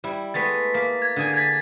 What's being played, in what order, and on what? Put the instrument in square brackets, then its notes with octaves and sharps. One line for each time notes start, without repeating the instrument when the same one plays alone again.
[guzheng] G3 E4
[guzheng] G#3 A3 B3 [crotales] A6 B6
[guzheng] A#3 [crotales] B6
[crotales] G#6
[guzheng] D3 G#4 G#5
[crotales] G#6 A6 B6